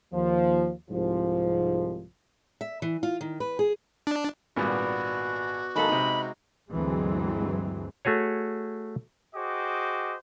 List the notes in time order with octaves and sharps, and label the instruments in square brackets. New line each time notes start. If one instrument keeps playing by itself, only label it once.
[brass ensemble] D#2 F3
C2 G#2 F3
[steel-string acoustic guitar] E5
E3
F4
D#3
B4
G#4
[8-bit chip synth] D4
[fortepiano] G#1 A#2 G3 [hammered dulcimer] B3 D5 F#5 [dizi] F#4
[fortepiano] D#3 A#3 A4 [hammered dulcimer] G#3 A#5 [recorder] B5
[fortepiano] C3 D#4
[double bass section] D2 G2 E3 F#3 G#3 C4
[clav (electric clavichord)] A3 F#4 G#4 C#5
[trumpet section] F#4 G#4 C5 D#5 G5 D6